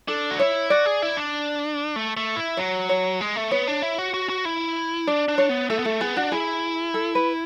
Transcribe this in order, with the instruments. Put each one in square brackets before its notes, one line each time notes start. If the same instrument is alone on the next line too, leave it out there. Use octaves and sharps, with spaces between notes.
[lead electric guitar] D4 [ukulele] A4
[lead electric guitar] F#4
[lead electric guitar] E4 [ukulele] C#5
[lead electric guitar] F#4 [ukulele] D5
[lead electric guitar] G#4
E4
D4
A3
A3
E4
[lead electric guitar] F#3 [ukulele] C#5
[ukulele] C#5
[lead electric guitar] G#3
A3
[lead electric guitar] B3 [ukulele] C#5
[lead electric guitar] D4
E4
F#4
F#4
F#4
E4
[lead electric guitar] D4 [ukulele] D5
[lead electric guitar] D4
[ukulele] C#5
[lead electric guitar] B3
[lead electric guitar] A3 [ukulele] A4
[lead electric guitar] B3
[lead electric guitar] A3 [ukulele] A4
[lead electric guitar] B3 [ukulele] G#4
[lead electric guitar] D4 [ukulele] F#4
[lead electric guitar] E4 [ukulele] G#4
[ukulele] A4
B4